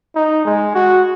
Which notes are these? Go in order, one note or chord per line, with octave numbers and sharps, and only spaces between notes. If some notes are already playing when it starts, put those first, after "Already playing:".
D#4
G#3
F#4